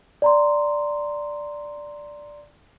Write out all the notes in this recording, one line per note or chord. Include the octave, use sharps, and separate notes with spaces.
D5 A#5 C6